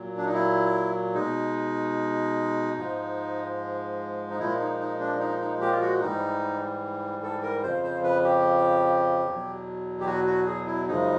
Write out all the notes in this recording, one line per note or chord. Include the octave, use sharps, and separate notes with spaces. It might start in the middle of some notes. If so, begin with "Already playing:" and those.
Already playing: A#2 F#3
D4
D#4
E4
B2 G#3 D#4
G#2 F3 G#3
D#4
A#2 F3 G#3 E4
D#4
D#4
D4
D#4
D#4
G4
F4
F#4
G#2 E3 G3 D#4
A4
A#4
F2 C#3 F3 C5
C5
B4
G4
E2 B2 F#3
G4
F#4
F#4
G#4
E4
F#2 C#3 F3 G#3 D#4